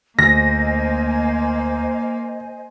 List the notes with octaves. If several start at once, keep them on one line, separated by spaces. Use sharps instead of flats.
D2 A#3 C5 D#5 G#5 A#6